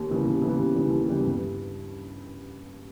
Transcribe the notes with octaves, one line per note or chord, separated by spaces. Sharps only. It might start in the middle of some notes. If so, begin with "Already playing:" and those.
Already playing: D#2
C#3 E3 G3 B3
D#2
C#3 E3 G3 B3
D#2
C#3 E3 G3 B3
D#2
C#3 E3 G3 B3
G2